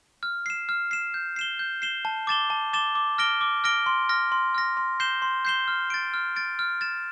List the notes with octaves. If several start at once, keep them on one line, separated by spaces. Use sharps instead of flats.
F6
C7 E7
F6
C7 E7
G6
C7 E7 G7
G6
C7 E7 G7
A5
D6 A6 E7 G7
A5
D6 A6 E7 G7
D6
F6 A#6 D7 G7
D6
F6 A#6 D7 G7
C6
F6 A#6
C6
F6 A#6
C6
G6 C7 E7 G7
C6
G6 C7 E7 G7
F6
A6 D7
F6
A6 D7
F6
A6 E7